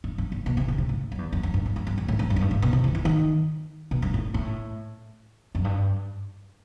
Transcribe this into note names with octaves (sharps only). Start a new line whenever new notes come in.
G2
G2
G2
B2
C3
D#3
C3
A2
F#2
E2
F#2
F#2
G2
F#2
G2
F#2
F#2
A2
G2
G2
F#2
G2
A2
B2
C3
E3
E3
D#3
B2
G2
A2
A2
F#2
G2